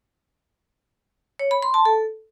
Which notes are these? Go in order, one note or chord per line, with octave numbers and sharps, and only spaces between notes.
C#5
B5
C6
A5
A4